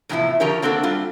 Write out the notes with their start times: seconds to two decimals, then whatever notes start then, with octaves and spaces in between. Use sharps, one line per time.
0.09 E2 A2 C3 E3 F3 E4
0.40 D3 D#3 F3 G4 A#4 C#5
0.62 A#3 C4 D4 F#4 A4
0.83 G3 F4